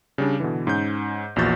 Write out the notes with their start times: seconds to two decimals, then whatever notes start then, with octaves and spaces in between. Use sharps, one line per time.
0.18 C#3 G3 D4
0.40 B2 D3 E3
0.67 G#2 C#4 G6
1.36 A#1 E2 A#2 F#4 G6 A6